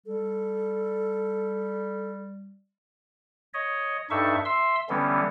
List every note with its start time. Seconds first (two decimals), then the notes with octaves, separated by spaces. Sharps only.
0.06 G3 A4
3.54 C#5 D#5
4.10 G2 D4 D#4 A4 E5 C#6
4.45 E5 C6 E6
4.89 D3 E3 G3 B3 C#4